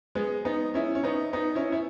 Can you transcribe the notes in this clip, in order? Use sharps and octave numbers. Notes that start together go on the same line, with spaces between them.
G#3 B3
B3 D#4
C#4 E4
C#4
B3 D#4
B3 D#4
C#4 E4
E4